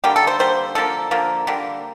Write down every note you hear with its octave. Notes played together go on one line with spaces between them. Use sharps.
D3 G3 A#3 G4
A4
C5
D3 G3 A#3 C5
D3 F3 A#3 A4
D3 F3 A#3
D3 G3 A#3